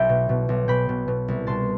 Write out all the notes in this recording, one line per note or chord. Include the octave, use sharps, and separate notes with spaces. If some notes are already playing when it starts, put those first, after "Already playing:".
Already playing: B1 E5 G5 A5 B5
B2
B2
B1
B2 G5 B5
B2
B2
C2
B2 A5 C6